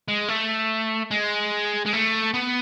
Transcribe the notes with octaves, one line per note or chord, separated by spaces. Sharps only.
G#3
A3
G#3
G#3
A3
B3